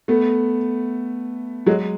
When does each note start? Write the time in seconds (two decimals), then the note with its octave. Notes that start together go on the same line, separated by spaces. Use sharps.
0.08 A3 B3
1.66 F#3 G#3